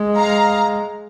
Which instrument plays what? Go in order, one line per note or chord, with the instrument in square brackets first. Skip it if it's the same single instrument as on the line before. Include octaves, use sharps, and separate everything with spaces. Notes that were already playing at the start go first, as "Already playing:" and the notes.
Already playing: [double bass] G#3
[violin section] F5 A#5